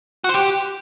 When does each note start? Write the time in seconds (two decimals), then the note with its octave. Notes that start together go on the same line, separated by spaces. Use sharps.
0.24 F#4
0.29 C5
0.34 G4